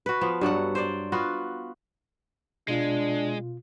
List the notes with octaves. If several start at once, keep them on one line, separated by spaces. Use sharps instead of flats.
F#4 B4
F3 B3
G2 F#3 A4 F#5
C5 D5
B3 F4 F#4
B2 G#3 D4 F4